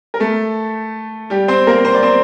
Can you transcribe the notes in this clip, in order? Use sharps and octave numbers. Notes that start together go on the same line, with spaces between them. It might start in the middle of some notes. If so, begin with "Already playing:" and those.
A#4
A3 A4
G3 G4
C4 C5
A#3 A#4
C5
D5
C4 C5